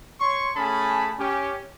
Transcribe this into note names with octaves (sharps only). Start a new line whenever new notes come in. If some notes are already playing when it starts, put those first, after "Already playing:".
C#5 C6 C#6
A3 C#4 G#4 A5 B5
C#4 G4